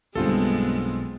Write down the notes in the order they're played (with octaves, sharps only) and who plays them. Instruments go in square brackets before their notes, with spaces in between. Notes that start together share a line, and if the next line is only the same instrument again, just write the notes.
[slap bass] B1 [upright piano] G2 D3 [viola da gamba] G#3 B3 [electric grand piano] C4 F4 A4